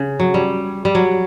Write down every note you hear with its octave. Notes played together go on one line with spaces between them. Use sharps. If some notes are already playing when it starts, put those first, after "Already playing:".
Already playing: C#3
F#3
G3
G3
F#3